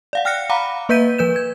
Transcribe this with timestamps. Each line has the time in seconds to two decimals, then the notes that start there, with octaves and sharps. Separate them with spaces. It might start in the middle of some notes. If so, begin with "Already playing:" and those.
0.13 D5 F5 F#5
0.25 G5 F6 F#6 A#6 C#7
0.50 F5 F#5 A#5 B5 D6
0.89 A#3 B4 E5 G6 B6 D#7
1.18 F3 B4 G6 E7
1.36 G#6